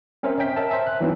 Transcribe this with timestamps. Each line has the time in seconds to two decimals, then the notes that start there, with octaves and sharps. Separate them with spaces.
0.23 C4 C#4 A#4 C5 E5
0.38 C#5 D#5 G5 B6
0.56 A#4 E5 A5
0.69 C5 E5 G#5
0.87 F#6
1.00 E3 F#3 B3 C4 D4 D#4